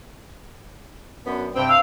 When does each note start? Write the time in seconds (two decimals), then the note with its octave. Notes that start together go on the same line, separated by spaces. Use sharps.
1.25 F#2 B3 D4
1.56 G2 C3 C4 G5
1.68 F5 E6